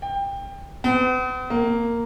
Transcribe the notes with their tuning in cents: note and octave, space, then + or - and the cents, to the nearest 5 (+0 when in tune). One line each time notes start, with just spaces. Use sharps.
G5 +20
B3 +45
A#3 -5